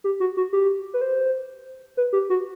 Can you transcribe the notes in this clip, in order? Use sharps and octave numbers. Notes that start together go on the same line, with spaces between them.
G4
F#4
F#4
G4
B4
C5
B4
G4
F#4